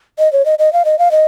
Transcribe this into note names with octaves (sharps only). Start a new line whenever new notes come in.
D#5
C#5
D#5
D#5
F5
D#5
F5
D#5